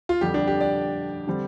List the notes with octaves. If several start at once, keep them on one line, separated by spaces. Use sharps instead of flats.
F4
F2 D3 G3 G4
D4
G4
D5
D3 G3 C4